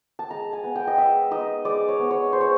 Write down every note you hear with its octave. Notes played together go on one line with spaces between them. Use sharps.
A5
G#3 A#5
G#5
B3
G5
D#5
G#3 E5
D#4 D#5
G#3 D5
C#5
B3
C#5
G#3 C5
C#5